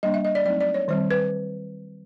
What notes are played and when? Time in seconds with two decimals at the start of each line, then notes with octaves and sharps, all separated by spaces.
0.03 G3 A#3 D4 D#5
0.14 E5
0.25 D#5
0.35 D5
0.45 F#3 A3 C4 D#4 D5
0.60 D5
0.74 C#5
0.88 D#3 G3 C4 C5
1.11 B4